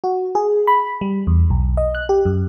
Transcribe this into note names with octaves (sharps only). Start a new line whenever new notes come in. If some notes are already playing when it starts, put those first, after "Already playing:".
F#4
G#4
B5
G3
E2
B1
D#5
F#6
G4
F#2